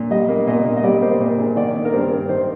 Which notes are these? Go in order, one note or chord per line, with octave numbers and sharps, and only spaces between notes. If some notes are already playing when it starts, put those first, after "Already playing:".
Already playing: A#2
G3 D#5
A#3
A#2 D#5
A#2
D#5
G3 D5
A#3 C5
A#2
A#2 G#4
D#3 D5
A#3
A#4
G2 C5
G2
D#3 C5